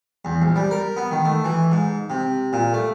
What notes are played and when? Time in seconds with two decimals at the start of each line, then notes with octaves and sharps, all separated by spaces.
0.25 E2
0.42 A#1
0.56 G3
0.71 A#4
0.97 B3
1.11 D#3
1.25 A3
1.44 E3
1.72 G#2
2.10 C3
2.53 A#2
2.73 A3